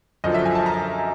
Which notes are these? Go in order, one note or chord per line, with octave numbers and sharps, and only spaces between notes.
F#2 D3 F3 D#5
E5
G#5
A5
A#5